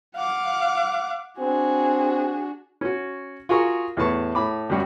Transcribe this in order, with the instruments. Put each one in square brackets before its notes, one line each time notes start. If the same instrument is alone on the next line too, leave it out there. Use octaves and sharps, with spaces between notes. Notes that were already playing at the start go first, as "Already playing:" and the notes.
[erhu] F5 [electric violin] F#5 D6
[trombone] C4 [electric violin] D4 F#4 [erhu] G#4
[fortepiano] C#4 F#4
F4 F#4 G#4 A#4 C#6
E2 A2 B4 A5 C#6
A2 B5 D6
F#2 F#3 G3 F#4